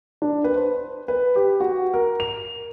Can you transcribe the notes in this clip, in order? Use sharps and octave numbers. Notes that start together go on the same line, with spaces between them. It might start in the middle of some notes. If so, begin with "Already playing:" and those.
D4
B4
C5
B4
G4
F#4
A#4
F7